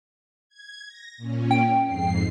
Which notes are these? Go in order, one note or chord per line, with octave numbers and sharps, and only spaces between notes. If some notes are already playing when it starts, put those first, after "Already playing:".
G#6
A#6
A#2 C#4
G5
F2 G#2 C7